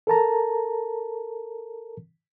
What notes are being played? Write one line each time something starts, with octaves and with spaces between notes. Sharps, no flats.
A4 A#4 A5 A#5